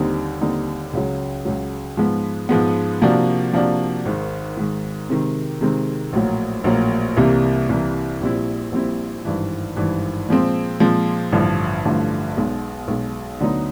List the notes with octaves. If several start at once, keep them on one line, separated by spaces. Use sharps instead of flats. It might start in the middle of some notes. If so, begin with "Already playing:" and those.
Already playing: D#2 D3 G3 C4 D#4
D#2 D3 G3 C4 D#4
C#2 C#3 F#3
C#2 C#3 F#3
G#2 F3 G#3 B3
G#2 F3 G#3 B3
C3 F3 A#3 D4 F#4
C3 F3 A#3 D4 F#4
G#1 G#2 D#3
G#1 G#2 D#3
C3 D#3 G#3 C4
C3 D#3 G#3 C4
A#1 A2 F#3 A#3
A#1 A2 F#3 A#3
C2 C3 E3 G3 A#3
C2 C3 E3 G3 A#3
A#1 A#2 G3 C4 E4
A#1 A#2 G3 C4 E4
G#1 G2 E3
G#1 G2 E3
A#2 F3 G#3 C4
A#2 F3 G#3 C4
A1 G2 D3 F3 A3
A1 G2 D3 F3 A3
B1 B2 G#3
B1 B2 G#3
D2 D3 F#3 B3 D#4